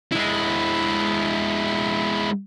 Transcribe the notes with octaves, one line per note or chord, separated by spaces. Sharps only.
G#3 E4